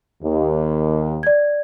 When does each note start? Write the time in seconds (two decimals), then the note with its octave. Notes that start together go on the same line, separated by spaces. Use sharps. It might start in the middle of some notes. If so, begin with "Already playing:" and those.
0.23 D#2
1.23 D5 G#6